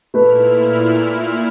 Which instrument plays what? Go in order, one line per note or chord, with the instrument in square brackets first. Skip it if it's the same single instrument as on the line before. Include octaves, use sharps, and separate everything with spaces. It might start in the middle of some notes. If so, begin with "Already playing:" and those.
[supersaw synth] A#2 E4 F6 [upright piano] A3 B4